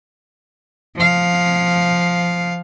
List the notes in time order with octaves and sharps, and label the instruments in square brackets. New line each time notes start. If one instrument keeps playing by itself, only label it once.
[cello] F3 F5